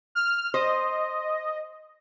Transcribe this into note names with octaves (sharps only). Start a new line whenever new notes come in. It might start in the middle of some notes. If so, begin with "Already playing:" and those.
F6
C5 D#5